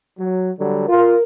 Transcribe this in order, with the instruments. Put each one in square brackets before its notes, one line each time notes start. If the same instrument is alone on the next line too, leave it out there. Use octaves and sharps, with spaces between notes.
[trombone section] F#3
D3 F#3 G3
[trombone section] F4 [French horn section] A#4